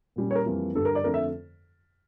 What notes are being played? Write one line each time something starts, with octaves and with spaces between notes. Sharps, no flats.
A#2 G3 C#4
C#5
A#4
F2 E3 G3 A#3
G2 D3 G3 D4 A4
A#4
D5
F2 D3 A3 A#4
E5